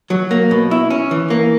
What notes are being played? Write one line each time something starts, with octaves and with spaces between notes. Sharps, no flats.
F#3
A#3
B2
E4
C#4
E3
A#3